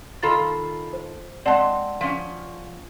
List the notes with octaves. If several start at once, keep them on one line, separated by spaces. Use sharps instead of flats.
D#3 F4 A4 B5 A6
C5
G#3 C4 D5 F#5 A5
F3 C#4